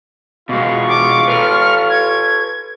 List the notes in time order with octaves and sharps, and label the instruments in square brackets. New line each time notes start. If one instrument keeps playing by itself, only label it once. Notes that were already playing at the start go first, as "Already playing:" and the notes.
[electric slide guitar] B2 G#3 [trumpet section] F4 C#6
[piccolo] D6
[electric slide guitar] A4 B4 [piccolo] F6
[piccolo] G#6